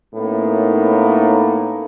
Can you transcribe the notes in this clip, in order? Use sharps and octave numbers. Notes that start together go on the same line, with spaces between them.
A2 A#3 B3 C#4 D#4